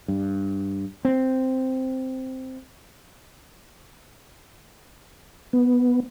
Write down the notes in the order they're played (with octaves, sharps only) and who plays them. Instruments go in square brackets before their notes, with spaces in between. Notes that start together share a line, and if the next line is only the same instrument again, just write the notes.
[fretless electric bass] G2
C4
[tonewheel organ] B3